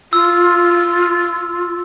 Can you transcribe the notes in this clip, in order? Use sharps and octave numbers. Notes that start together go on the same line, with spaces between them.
F4 E6